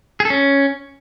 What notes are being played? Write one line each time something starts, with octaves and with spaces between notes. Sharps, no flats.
G#4
A4
C#4